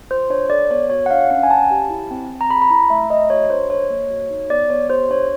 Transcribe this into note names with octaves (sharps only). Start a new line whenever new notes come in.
F4 C5
D4 C#5
A4 D5
B3 C#5
F#4 C#5
F#5
D4 F5
C#4 F#5
G#5
C#4 A5
G4
E4
C4
C4
A#5
G#4 B5
B5
E4 A#5
A3 E5
A3 D#5
F#4 C#5
D4 C5
A4 C#5
A#3
F#4
D#4
B3 D5
B3 C#5
G4 C5
D4 C#5